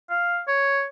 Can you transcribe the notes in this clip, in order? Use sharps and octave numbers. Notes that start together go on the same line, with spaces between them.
F5
C#5